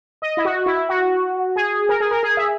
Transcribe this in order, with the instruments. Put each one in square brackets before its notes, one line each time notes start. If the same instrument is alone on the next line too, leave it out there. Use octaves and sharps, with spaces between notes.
[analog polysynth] D#5
E4
F#4
E4
F#4
G#4
A#4
G#4
A#4
G#4
E5